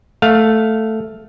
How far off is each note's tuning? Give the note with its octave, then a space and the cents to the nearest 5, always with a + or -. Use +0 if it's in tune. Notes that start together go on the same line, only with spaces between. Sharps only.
A3 +0 F5 +10